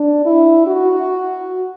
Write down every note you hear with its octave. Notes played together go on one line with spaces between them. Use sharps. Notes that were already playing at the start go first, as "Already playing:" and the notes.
Already playing: D4
E4
F#4